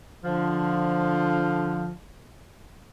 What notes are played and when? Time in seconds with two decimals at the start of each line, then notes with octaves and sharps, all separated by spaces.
0.24 D3 F3